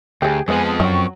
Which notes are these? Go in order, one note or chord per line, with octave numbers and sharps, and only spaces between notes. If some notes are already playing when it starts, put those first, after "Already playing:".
D2 G4 G#4
F2 F3 G#3 B3 B4 C5 G#5
F#5 A5 D#6
F#2 D#3 F#3 G5 C#6